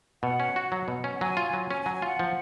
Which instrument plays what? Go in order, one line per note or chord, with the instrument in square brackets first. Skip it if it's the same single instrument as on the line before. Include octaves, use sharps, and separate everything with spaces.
[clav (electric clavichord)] B2 [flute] F#5
[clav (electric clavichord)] C#4
F#4
F#3
B2
C#4
[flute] F#5
[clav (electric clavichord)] F#3 [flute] G#5
[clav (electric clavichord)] F4
F#3
[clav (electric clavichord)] C#4 [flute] G#5
[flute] G#5
[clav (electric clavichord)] F#3
[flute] G#5
[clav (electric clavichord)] F4 [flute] F#5
[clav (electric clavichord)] F3